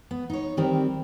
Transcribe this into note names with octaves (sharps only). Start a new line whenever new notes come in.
B3
D#4 C#5
D#3 G3 C4 A#4